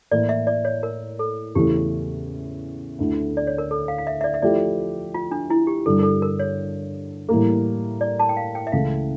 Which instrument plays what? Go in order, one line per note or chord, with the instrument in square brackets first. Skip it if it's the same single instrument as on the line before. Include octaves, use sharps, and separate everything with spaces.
[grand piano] A2 E3 A#3 E4 [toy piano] D5
[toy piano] E5
D5
C#5
A#4
A4
[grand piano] E2 C#3 E3 A3 C#4 [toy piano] G4
[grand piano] D2 D3 A3 E4
[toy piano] D5
C#5
A#4
A4
F5
F5
E5
E5
D5
E5
[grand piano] F3 A3 E4 G4 [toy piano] D5
[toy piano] F4
D4
E4
G4
[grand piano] G2 D3 G3 D4 [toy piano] A4
[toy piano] A#4
A4
A#4
C#5
[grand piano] A2 E3 G3 A#3
[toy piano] D5
A5
G5
F5
G5
E5
[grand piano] C#2 C#3 E3 A3 E4 [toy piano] F5